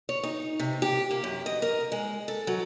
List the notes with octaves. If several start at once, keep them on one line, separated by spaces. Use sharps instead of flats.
C#5
D#4
C3
G4
A#3
F#2
D#5
A#4
G#3
A4
F#3